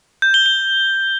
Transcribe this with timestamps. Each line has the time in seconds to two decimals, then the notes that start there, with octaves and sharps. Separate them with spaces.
0.22 G6
0.34 G7
0.46 G7